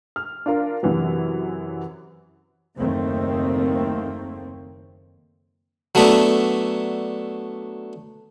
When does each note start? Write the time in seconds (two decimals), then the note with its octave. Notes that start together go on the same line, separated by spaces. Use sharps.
0.16 F6
0.46 D4 F4 A#4
0.83 F#2 C3 E3 F#3
2.79 F#1 D#2 D#3 A3 A#3 C4
5.95 F#3 A3 B3 D4 E5